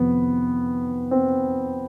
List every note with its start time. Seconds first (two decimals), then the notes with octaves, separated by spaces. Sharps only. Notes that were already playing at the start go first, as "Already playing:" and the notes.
Already playing: F2 C3 D#3 B3
1.11 C4